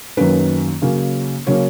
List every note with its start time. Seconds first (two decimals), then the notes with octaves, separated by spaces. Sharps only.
0.17 F#2 D#3 A#3 C#4 B4
0.82 C#3 F#3 A#3 C#4
1.47 C#3 F#3 A#3 C#4 C#5